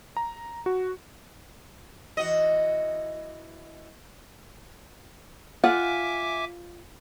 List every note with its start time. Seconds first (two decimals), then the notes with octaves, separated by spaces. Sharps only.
0.17 A#5
0.66 F#4
2.17 E3 F#4 D#5
5.64 F4 E5 F#5 G#5 D6